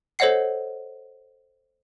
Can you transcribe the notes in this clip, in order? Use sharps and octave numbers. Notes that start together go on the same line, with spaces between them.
A4 C5 C#5 D#5 F#5 C7